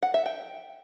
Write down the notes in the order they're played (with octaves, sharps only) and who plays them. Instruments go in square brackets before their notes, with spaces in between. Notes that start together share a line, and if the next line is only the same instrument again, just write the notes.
[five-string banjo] F#5
E5
G5